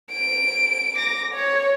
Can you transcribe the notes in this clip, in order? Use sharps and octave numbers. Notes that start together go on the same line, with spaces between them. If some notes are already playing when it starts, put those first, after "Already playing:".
D7
D6 A#6
C#5